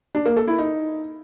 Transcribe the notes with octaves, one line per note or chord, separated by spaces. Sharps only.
D4
A#3
A4
E4
D#4